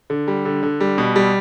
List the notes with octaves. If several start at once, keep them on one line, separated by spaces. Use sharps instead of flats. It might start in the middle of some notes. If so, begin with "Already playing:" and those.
D3
G3
D3
D3
G3
B2
G3